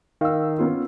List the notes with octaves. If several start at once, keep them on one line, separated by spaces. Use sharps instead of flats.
D#3 F5 E6
B3 C#4 F4